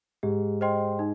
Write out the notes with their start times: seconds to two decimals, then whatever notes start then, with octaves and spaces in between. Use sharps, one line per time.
0.23 G#2 G4
0.61 C5 D#5 G5 C6
0.99 D#4